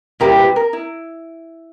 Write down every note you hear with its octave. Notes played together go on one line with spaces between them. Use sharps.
A#2 G3 C4 E4 G4 A#4
B4
A#4
E4